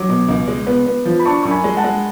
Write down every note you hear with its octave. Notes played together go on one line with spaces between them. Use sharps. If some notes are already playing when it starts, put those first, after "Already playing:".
Already playing: F#3 D6
B2
C#2
G#3
B3
B3
F3
B5
D4 A5 C#6
F#2 C#6
G#5 B5
G#3
F#5 A5
G#3